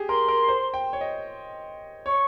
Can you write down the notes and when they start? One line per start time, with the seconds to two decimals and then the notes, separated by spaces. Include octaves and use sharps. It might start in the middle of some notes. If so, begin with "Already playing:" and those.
Already playing: G4 G#4
0.08 A#4 C6
0.28 A#4
0.48 C5
0.74 G5
0.93 C#5
1.01 D#5
2.06 C#5 C#6